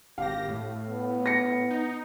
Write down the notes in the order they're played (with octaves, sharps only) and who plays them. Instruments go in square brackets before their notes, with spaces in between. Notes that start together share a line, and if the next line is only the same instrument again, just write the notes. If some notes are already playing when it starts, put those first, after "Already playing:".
[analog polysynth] G#1 G4 A#6 [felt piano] F5
[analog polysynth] A2
[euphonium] B3
[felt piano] A#6 C#7
[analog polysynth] D#4